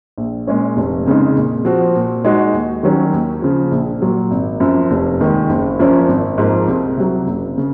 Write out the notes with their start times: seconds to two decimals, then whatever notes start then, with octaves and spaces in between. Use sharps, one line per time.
0.18 A#1
0.47 A#2 G#3 C#4
0.76 F1
1.06 F2 C#3 G#3 D#4
1.36 A#2
1.65 F3 C4 F#4
1.95 A#2
2.24 G#3 D#4 F#4
2.53 D#2
2.83 D#3 F#3 C#4 F#4
3.13 D#2
3.42 C#3 F3
3.71 A#1
4.02 A#2 F#3
4.31 G#1
4.60 F#2 F3
4.91 F1
5.20 D#2 D#3 G#3
5.49 F#1
5.79 F#2 F3 A#3 C#4
6.08 G#1
6.38 G#2 F3 A#3
6.68 C2
6.98 C3 F#3
7.27 F#1
7.58 C#3